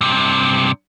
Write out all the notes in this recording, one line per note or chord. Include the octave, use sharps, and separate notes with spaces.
G2 C3